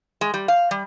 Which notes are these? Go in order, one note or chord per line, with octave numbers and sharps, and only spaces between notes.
G#3
G3
F5
G3